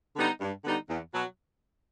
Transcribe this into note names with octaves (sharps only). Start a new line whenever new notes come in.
D3 G3 B3 D#4
G2
D3 G3 B3 D#4
E2
B2 F#3